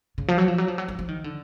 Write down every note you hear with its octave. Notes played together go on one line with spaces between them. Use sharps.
C#3
F3
F#3
F3
F#3
F3
F#3
F3
F3
D#3
D3